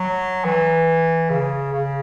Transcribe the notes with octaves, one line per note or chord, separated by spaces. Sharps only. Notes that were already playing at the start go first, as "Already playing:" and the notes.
Already playing: F#3
E3
C#3
C#3